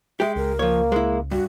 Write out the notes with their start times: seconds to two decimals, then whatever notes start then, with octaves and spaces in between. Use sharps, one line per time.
0.20 G#3 G4 E5
0.36 C#2 A#4
0.59 F3 A#3 C#5
0.92 G#3 E4
1.31 G2 F#4